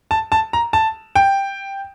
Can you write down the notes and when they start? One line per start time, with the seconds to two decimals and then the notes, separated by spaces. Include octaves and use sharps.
0.11 A5
0.32 A5
0.53 A#5
0.73 A5
1.15 G5